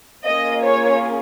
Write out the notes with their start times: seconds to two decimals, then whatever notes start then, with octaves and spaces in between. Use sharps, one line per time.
0.25 A#3 C#4 F4 G#4 D#5
0.64 C#5